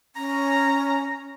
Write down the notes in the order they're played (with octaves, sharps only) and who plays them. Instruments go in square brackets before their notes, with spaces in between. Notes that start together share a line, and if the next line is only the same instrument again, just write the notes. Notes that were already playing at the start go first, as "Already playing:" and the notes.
[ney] C#4 [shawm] A#5